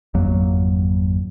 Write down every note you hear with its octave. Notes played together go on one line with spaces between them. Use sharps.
G#1 F2 F#3 A#3